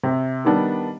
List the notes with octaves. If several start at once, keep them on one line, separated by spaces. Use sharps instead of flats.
C3
D#3 G3 B3 D4